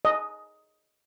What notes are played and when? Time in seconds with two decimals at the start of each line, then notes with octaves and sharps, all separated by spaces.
0.05 D#5